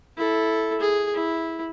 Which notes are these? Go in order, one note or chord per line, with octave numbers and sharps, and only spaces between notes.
E4 A4
G#4
E4